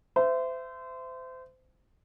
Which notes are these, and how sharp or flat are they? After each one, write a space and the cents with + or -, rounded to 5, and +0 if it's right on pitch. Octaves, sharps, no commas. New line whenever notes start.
C5 -30 E5 +15